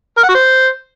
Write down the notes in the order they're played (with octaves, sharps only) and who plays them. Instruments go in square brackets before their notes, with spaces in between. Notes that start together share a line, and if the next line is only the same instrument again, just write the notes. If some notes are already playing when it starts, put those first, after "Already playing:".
[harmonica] A#4
F#5
F#4
C5